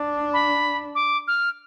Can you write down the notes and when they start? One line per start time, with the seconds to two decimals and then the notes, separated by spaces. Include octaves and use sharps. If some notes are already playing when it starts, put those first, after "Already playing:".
Already playing: D4
0.33 B5
0.95 D6
1.28 F6